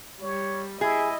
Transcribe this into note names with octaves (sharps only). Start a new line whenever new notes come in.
G3 C#5
E4 G#4 D#5